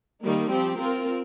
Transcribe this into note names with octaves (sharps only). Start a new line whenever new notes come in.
D#3 G3 A#3 D#4
F3 C4 G4
C4 F4 A#4